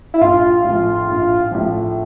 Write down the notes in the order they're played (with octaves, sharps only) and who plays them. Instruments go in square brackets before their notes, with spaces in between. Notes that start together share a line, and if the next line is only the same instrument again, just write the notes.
[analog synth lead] E4
[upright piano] A#1 [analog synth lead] F4
[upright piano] A2 F3
A#1
A2 F3